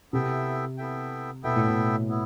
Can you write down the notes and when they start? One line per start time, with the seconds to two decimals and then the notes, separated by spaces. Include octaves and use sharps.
0.13 C3 B3 E4 A4 E5 G5
0.78 B3 E4 A4 E5 G5
1.43 B2 B3 E4 A4 E5 G5
1.56 A2
1.67 B2
2.09 B3 E4